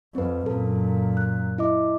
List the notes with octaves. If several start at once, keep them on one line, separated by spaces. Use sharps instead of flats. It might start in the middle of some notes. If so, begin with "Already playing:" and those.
F2 C4 B4
F#2 A#2 A4
F#6
E4 D#5 D6